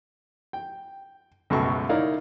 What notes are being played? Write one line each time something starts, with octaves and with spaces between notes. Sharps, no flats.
G5
C#2 F#2 B2 F#3 A3 C#6
D#4 E4 A#4 C#5 D5 F5